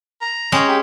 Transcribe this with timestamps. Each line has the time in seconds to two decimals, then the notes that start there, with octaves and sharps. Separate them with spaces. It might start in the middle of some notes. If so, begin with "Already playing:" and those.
0.22 A#5
0.52 G#3 C#4 G5
0.68 G4